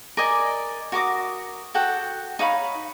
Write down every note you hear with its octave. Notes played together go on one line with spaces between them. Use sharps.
A#4 D5 D#5 G#5
F#4 A#4 D6 D#6
F#4 A4 F#5 G5
D#4 C#5 F5 B5